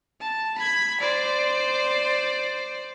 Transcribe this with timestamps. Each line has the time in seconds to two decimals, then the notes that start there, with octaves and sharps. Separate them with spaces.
0.20 A5
0.58 B5 G#6
1.00 C5 D5